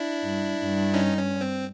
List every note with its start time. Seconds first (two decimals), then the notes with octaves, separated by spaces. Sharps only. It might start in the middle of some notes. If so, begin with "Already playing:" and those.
Already playing: D4 E4
0.23 G2
0.58 G2
0.94 C#4 D#4
1.17 C#4
1.41 C4